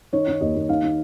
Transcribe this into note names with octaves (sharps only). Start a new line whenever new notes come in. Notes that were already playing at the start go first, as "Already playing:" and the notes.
D#3 C#5
D#3
D#2 D#5
D#2
D#3 F5
D#3